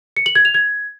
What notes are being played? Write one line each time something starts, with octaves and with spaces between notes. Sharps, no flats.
C#7
F#7
G#6
F7
G#6